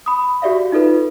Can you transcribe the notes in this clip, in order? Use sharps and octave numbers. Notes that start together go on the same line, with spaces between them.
B5 D#6
F#4 G4 D5 E5 F5
D#4 F4 A4 B4